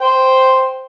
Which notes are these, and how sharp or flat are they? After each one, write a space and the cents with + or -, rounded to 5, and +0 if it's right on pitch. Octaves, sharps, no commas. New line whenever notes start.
C5 +0 G5 +0